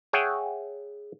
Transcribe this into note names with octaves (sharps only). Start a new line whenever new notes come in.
G#4 C#5 E5 F#5 G5